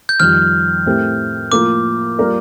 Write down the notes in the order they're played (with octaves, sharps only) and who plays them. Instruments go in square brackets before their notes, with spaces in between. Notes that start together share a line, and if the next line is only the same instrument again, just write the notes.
[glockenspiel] G6
[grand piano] F2 D#3 G3 [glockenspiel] F6
[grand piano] A2 A3 C4 G4 A#4
[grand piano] A2 F3 A#3 F4 A#4 [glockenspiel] D6
[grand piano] G3 A#3 F4 A#4 D5